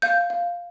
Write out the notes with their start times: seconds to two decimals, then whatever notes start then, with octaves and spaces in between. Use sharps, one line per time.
0.02 F5 G6
0.30 F5